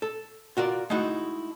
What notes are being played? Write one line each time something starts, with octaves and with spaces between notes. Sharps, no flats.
A4
F4 F#4 A#4 D5
G#3 A3 D#4 E4 F#4